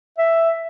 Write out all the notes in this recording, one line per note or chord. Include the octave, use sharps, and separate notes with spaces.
E5